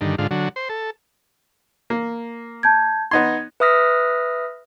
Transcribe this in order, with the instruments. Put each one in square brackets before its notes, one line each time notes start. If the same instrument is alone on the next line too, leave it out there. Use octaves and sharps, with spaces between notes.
[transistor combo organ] G2 D3 D#3
G#2 D3 F4
D3 F#3
C5
A4
[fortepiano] A#3
[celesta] A5 G6 G#6
[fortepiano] B3 D#4 C6 [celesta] G#6
[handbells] B4 E5 D#6 F6 A#6 B6